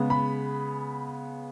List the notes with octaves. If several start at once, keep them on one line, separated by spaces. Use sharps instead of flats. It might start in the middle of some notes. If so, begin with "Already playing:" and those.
Already playing: C#3 G#3 B3
B5